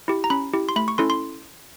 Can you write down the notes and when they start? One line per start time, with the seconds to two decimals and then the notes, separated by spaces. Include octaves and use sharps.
0.08 E4 G4
0.24 A#5
0.30 C#4 B5
0.54 E4 G4
0.69 C6
0.76 A3 B5
0.88 C#6
0.98 C#4 E4 A4 C6
1.10 C6